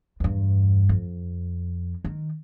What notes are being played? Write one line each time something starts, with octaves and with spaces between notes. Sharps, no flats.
E2 G2
F2
D#3